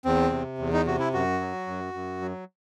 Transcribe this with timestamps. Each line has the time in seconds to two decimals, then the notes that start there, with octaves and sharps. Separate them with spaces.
0.05 E2 C4
0.32 C3
0.59 E2
0.73 D#4
0.86 C3 F#4
0.99 E4
1.13 F#2 F#4
1.41 F#3
1.67 F#2
1.94 F#2
2.22 F#3